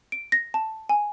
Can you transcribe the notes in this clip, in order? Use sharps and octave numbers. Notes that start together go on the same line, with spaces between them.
D7
A#6
A5
G#5